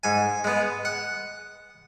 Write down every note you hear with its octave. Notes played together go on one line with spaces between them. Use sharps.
G#2 G#5
G#3 B3
F#5